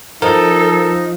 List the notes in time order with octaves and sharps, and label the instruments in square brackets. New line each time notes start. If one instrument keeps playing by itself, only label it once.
[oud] F3 [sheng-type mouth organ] D#4 [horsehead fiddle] A4 [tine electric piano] A#4